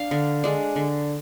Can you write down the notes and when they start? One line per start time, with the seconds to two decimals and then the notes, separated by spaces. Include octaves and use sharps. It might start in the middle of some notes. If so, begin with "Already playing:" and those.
Already playing: D4 F5
0.11 D3
0.44 G#3 D4
0.76 D3